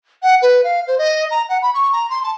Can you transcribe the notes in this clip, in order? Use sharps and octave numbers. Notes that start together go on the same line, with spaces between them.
F#5
B4
F5
C5
D#5
A#5
F#5
B5
C#6
A#5
C6
A5